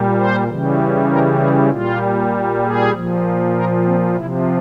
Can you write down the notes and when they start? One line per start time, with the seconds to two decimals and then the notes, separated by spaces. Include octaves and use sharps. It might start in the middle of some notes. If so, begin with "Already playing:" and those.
Already playing: A#2 G3
0.18 C5
0.47 C#3 E3 G3
1.10 A#4
1.39 G#4
1.70 A#2 G3 F4
2.64 G#4
2.94 A#2 F3
3.55 A#4
3.85 C4
4.16 C3 F3 E4